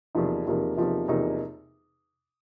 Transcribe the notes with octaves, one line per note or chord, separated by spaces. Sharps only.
E2 C3 F3 A#3 D#4
E2 C3 F3 A#3 D#4
E2 C3 F3 A#3 D#4
E2 C3 F3 A#3 D#4